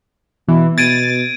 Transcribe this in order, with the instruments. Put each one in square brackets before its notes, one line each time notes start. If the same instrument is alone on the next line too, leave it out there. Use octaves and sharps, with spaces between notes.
[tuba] B2 [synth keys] E3
[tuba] B2 [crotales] G#6 D7 D#7 [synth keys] A6